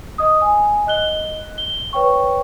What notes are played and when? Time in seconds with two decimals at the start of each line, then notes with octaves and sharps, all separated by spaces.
0.18 D#5 D#6
0.41 G#5
0.87 D#5 F#6 G7
1.58 G7
1.93 B4 C#5 G5 C#6